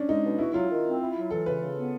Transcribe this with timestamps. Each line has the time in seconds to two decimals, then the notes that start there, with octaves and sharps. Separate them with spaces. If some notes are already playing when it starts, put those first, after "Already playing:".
Already playing: C#4 D4
0.09 G#3 D#4
0.24 B2
0.39 E4 F#4
0.53 F#3 F4
0.70 D#3
0.85 C4
1.00 E4
1.15 F#3
1.31 E3 A4
1.45 C#3 B4
1.61 C#3
1.76 B3